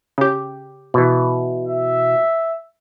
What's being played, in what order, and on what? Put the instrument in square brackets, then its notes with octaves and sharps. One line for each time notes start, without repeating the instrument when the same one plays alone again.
[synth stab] C#3 G4
[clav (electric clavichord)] B2 E3
[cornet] E5